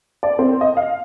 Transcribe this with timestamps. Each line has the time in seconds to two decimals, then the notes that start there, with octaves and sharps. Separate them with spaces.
0.23 D5
0.39 C4
0.61 D#5
0.77 F5